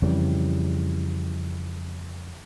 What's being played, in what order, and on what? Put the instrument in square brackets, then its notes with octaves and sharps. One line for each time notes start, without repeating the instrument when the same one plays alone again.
[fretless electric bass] F2 C#3 E3 G3